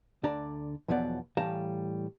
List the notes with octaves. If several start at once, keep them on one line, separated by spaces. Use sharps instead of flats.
D2 D3 D4 D5 A#5
B1 E2 F3 F#3 B3 D5
A2 E3 G3 F5 A5 A#5